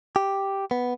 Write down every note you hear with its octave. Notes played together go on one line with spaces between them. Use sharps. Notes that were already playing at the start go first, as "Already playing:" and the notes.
G4
B3